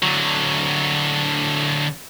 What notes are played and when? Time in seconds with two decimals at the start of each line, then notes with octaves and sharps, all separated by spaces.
0.02 D3 F#3